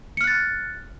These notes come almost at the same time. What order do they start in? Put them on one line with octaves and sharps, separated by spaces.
C#7 F6 F#6 A6